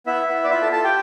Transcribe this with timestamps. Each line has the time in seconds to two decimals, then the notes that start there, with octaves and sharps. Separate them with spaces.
0.06 B3 E4 E5
0.29 B3
0.44 D5
0.50 E4 F4 E5
0.61 A4 A5
0.72 A4 A5
0.84 G4 G5